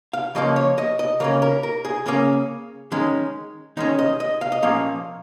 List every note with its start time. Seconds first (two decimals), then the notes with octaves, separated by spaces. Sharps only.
0.13 F5
0.35 C#3 F3 A#3 C#4 D#5
0.56 C#5
0.78 D#5
0.99 D#5
1.20 C#3 A#3 C#4 A#4
1.42 A#4
1.63 A#4
1.85 G#4
2.06 C#3 A#3 C#4 G#4
2.92 D#3 G#3 C#4
3.77 D#3 G#3 C#4 D#4
3.99 D#5
4.20 D#5
4.41 F5
4.52 D#5
4.63 A#2 F3 A#3 C#4 F5